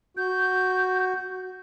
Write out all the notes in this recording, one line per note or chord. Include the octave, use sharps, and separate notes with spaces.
F#4 G6